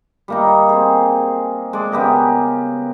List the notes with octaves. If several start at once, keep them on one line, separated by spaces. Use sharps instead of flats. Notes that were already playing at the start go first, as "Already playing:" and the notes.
G3 A#3 D#4
C4 G#4
G#3 D5
C#3 B3 G4 A#4